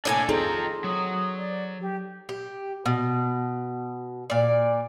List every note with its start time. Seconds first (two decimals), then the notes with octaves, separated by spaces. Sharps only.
0.05 A2 A#3 D4 A4 G#5
0.29 C4 D#4 F4 G#4 A4 G5 A#5
0.84 F#3 D#6
1.37 D5
1.80 G4
2.29 G4
2.86 B2
4.30 A#2 D5